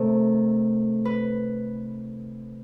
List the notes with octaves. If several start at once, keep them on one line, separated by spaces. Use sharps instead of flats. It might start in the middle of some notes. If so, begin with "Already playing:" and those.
Already playing: C3 D#3 A3 C4 A4
B4